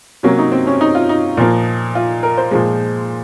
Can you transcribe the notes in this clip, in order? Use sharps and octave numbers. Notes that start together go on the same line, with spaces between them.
C3 F#3 A#3 C#4
D#4
C4
C#4
D#4
F4
D#4
A#2 F3 A#3
F4
A#4
C5
A#2 F3 G#3